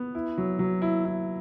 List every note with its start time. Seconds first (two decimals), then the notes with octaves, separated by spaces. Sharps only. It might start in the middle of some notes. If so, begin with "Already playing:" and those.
Already playing: B3
0.15 E4
0.38 F#3
0.59 F#3
0.82 E4
1.05 E4